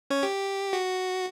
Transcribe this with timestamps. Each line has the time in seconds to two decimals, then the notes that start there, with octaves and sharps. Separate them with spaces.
0.10 C#4 C#5
0.23 G4
0.73 F#4